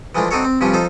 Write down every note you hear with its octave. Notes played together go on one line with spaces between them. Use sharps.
E3 F3 G#3 A3 D4
C4 D4 D#4 F#4 A4 C#5
C4
G2 C3 F3 C#4 D4
F3 D#4 A4 C5